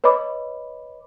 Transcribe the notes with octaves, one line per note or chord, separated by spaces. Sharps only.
B4 C#5 D#5 B5 D6